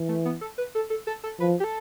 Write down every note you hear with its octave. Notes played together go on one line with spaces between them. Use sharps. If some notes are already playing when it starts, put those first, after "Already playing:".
Already playing: E3
A3
B3
A4
B4
A4
A4
A4
A4
F3 B4
G4
A4